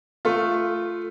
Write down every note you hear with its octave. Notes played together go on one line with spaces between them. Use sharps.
A3 F4